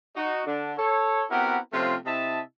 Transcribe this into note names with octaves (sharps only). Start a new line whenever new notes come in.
D#4 F#4
D3 D4
A4 C#5
B3 C4 E4 F#4 G4 A#4
C3 F3 A3 C#4 F4
C3 E4 D#5 E5 A5